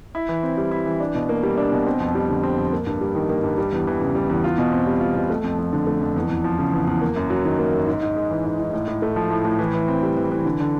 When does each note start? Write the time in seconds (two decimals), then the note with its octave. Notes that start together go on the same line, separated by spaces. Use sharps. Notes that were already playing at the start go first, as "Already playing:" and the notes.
0.15 E4
0.29 E3
0.43 C4
0.57 G3
0.71 E4
0.86 E3
1.00 D4
1.15 B2
1.29 A#3
1.43 G3
1.57 D4
1.72 B2
1.86 C4
2.00 F2
2.15 G3
2.29 D3
2.43 C4
2.58 F2
2.72 A#3
2.86 G2
3.01 G3
3.15 D#3
3.29 A#3
3.43 G2
3.58 G3
3.73 E2
3.87 E3
4.01 C#3
4.15 G3
4.30 E2
4.44 F4
4.58 B2
4.72 C4
4.87 G3
5.01 F4
5.15 B2
5.30 A3
5.44 F2
5.58 F3
5.73 D3
5.87 A3
6.01 F2
6.16 E2
6.30 E2
6.44 F3
6.59 C#3
6.73 E2
6.87 E2
7.01 A#3
7.16 F#2
7.30 F#3
7.45 D#3
7.59 A#3
7.73 F#2
7.87 G#2
8.02 G#2
8.16 G#3
8.31 E3
8.45 G#2
8.59 G#2
8.73 A2
8.88 A2
9.02 A3
9.16 F3
9.30 A2
9.45 A2
9.59 E3
9.73 E3
9.88 C4
10.03 G3
10.17 E3
10.31 E3
10.45 D3
10.60 D3